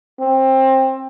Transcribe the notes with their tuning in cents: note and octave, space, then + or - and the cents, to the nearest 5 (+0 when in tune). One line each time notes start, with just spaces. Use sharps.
C4 +20